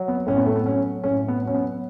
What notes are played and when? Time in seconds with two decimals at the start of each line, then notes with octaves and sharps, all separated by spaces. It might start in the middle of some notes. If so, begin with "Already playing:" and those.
Already playing: F#3
0.08 B3
0.27 A2 C#4
0.37 B3
0.46 A3
0.55 B3
0.65 F#3 C#4
1.03 A2 C#4
1.28 B3
1.42 F#3
1.47 C#4
1.55 B3